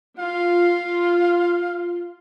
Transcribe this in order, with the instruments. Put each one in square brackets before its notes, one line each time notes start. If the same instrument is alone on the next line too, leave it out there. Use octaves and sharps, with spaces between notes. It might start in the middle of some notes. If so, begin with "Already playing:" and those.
[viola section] F4 [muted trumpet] F5